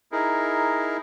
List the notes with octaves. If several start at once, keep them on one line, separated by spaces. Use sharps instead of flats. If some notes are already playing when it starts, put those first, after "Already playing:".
D#4 E4 G#4 A#4